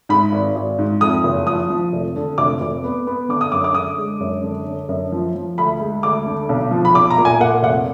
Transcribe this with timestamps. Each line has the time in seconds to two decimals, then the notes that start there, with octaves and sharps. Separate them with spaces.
0.09 G#2 B5
0.32 G#1
0.55 G#1
0.79 G#2
1.01 F2 D#6
1.24 F#1
1.46 F3 D#6
1.70 F3
1.93 F1
2.16 D3
2.38 F1 D6
2.61 F1
2.84 B3
3.07 B3
3.29 D3 D6
3.41 D#6
3.52 F#2 D6
3.64 D6
3.74 D3 D#6
3.98 G#3
4.20 F#2
4.44 D3
4.66 D3
4.89 F#2
5.12 F3
5.35 F3
5.58 D2 B5
5.80 G#3
6.03 D2 D6
6.26 D3
6.49 B1
6.71 F3
6.85 B5
6.95 B1 D6
7.10 A#5
7.18 A#2
7.25 G#5
7.40 A#3 F#5
7.63 F1 F#5